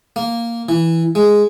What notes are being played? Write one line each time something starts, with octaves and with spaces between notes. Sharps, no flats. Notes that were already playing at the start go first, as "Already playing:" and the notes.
A#3
E3
G#3